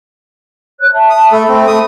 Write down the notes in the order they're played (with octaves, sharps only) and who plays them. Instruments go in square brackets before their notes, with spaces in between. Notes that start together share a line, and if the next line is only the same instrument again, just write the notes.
[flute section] C#5 F#6
E5 A5
[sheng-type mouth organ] D#6
[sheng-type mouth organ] A3 A4 [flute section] B5
[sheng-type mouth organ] A3 C4
A3 D#6